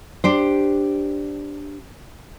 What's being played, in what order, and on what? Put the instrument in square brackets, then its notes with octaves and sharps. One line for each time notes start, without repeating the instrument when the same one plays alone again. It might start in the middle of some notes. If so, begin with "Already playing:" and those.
[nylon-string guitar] D4 G4 C5